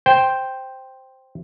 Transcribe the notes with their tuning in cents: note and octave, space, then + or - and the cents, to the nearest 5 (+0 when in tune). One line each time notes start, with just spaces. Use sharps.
C5 +0 G5 +0